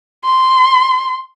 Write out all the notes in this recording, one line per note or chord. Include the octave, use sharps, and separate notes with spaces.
C6